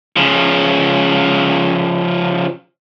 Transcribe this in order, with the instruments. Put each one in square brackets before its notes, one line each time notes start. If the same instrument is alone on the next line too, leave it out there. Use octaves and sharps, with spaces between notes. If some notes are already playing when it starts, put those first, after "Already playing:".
[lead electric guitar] C#3 F3